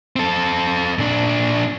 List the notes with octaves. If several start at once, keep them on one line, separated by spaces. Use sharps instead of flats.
C4 A4
A#2 D4